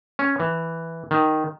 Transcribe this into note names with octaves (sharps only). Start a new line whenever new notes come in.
C#4
E3
D#3